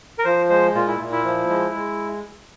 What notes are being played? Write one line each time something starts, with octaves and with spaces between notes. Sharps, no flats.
A#4
F3 C5
G#3 C5
A#2 F4
E4
A#2
E4
F3
G#3
G#3